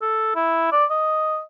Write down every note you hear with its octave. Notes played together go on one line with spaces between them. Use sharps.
A4
E4
D5
D#5